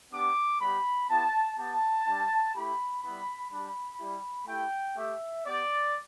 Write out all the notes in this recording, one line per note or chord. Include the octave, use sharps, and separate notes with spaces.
B3 D4 G4 D6
G3 B3 G4 B5
B3 E4 G4 A5
B3 G4 A5
G3 D4 G4
A3 E4 G4 B5
G3 B3 E4 B5
G3 D4 G4 B5
G3 E4 G4
A3 E4 G4 G5
A3 G4 E5
B3 G4 D5